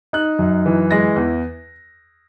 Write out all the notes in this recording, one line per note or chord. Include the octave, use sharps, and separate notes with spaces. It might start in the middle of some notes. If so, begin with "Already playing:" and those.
D#4 F#6
F#2
E3
G#3 A#6
E2